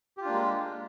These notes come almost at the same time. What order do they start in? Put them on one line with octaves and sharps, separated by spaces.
G4 F4 D4 A#3 G#3